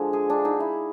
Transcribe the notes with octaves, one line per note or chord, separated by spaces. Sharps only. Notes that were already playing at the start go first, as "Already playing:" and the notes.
Already playing: D3 F3 G#3
G#4
D4
D#4
E4